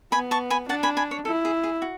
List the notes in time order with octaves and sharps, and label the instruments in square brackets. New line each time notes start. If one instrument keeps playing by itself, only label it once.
[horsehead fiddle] B3 [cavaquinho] G#5 B5
[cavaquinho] A5 C#6
G#5 B5
[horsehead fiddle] D4 [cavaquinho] F#5 A5
[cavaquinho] G#5 B5
G#5 B5
C#5
[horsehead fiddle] E4 [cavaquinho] A4
[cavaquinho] G#4
G#4
F#4